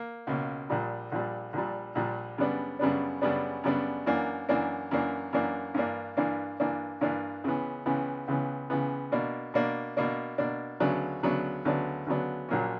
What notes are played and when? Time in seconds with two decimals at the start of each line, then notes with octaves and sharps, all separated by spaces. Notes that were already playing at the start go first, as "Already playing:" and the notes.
Already playing: A#3
0.27 C#2 B2 A#3
0.70 A#1 A#2 G3
1.12 A#1 A#2 G3
1.53 A#1 A#2 G3
1.95 A#1 A#2 G3
2.38 F#2 C#3 G3 B3 D4
2.79 F#2 C#3 G3 B3 D4
3.21 F#2 C#3 G3 B3 D4
3.64 F#2 C#3 G3 B3 D4
4.06 F#2 E3 A#3 D4
4.49 F#2 E3 A#3 D4
4.91 F#2 E3 A#3 D4
5.33 F#2 E3 A#3 D4
5.74 G2 E3 A#3 D4
6.17 G2 E3 A#3 D4
6.60 G2 E3 A#3 D4
7.01 G2 E3 A#3 D4
7.44 C#2 C#3 E3 B3
7.86 C#2 C#3 E3 B3
8.28 C#2 C#3 E3 B3
8.70 C#2 C#3 E3 B3
9.12 B2 A#3 D4
9.54 B2 A#3 D4
9.97 B2 A#3 D4
10.38 B2 A#3 D4
10.80 D2 C#3 F#3 B3 D4
11.23 D2 C#3 F#3 B3 D4
11.65 D2 C#3 F#3 B3 D4
12.07 D2 C#3 F#3 B3 D4
12.49 A#1 A#2 F#3 A#3 C#4